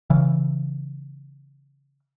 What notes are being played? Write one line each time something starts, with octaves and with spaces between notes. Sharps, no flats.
C#3 E3